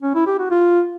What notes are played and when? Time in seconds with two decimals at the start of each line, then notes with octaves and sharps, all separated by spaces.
0.03 C#4
0.15 E4
0.27 G4
0.39 F#4
0.51 F4